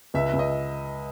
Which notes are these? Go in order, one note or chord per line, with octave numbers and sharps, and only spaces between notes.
C#2 E5
E5
C#2
D#5